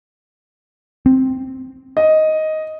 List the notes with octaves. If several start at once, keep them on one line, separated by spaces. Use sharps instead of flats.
C4
D#5